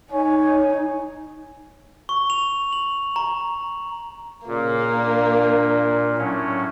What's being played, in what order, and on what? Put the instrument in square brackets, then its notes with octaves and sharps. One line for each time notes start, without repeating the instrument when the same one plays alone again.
[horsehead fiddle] D#4 [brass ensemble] C#5 G#5
[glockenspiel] C#6
F7
F#7
A#5
[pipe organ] A#2 [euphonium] C#3 [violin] A#3
[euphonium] D4
[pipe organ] A2 F#3 C#4